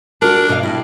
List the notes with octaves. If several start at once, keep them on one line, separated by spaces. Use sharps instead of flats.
D4 F#4 A#4
B2 F5
G2 E4